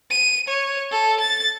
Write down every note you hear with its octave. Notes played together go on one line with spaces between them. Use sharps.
D#7
C#5
A4
A6